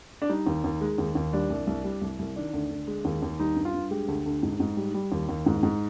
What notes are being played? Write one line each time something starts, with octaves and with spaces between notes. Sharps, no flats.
D4
G3 D#4
D#2
D#2
G#3
D#2
D#2
G3 D4
C2
C2
G3
C2
C2
D#3 D4
D2
D2
G#3
D#2
D#2
G3 D#4
G2
F4
G2
G#3 G4
D2
D2
G#2
G#2
G3
G3
D#2
D#2
G#2
G#2